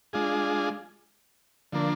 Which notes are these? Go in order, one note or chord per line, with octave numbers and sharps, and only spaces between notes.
G#3 D4 F4 G#4
D3 F3 A#3 D4